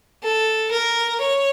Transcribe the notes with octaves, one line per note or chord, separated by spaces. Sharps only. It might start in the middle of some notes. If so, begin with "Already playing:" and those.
A4
A#4
C#5